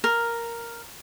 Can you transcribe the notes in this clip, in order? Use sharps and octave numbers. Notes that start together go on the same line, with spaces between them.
A#4